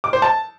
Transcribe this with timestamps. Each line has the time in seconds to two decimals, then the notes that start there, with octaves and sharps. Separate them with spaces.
0.04 D6
0.13 C5
0.22 A5